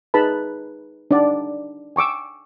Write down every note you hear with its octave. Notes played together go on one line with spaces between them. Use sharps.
D#4 G#4 B4 A5 B5
D4 D#4 D5 F#5
G#5 C#6 D6 E6